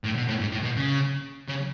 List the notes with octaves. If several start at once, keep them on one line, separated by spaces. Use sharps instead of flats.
A2
B2
A2
G#2
A2
B2
C#3
C#3